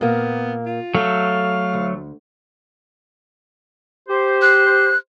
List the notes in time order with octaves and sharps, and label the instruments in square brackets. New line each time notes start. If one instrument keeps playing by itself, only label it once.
[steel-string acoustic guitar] A#2 A#3 [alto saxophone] B3
[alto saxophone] F4
[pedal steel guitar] F#3 A3 [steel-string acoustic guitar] A4 [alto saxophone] F5
[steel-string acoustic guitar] D2
[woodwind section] G4 C5
[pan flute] F#6